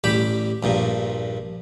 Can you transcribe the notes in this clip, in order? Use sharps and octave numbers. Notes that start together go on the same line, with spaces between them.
A1 G3 G4 B5
A#1 G2 A#2